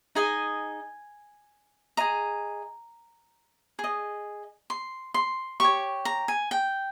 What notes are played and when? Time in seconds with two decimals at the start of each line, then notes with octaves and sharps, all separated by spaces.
0.15 D#4 G#4 D#5 G#5
1.97 G#4 D#5 A#5
3.79 G#4 D#5
4.70 C6
5.14 C6
5.60 G4 C#5 C#6
6.05 A#5
6.28 G#5
6.51 G5